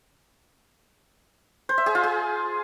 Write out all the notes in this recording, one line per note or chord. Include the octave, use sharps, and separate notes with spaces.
C5
E5
G#4
F4
G#4